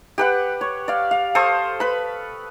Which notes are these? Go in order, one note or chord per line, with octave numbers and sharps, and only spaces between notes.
G4 B4 F#5
C#5
D5 F5
F5
A4 C5 C#6 D#6
B4 B5